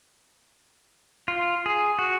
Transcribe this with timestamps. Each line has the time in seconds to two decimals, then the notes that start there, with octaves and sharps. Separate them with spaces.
1.28 F4
1.66 G#4
1.99 F#4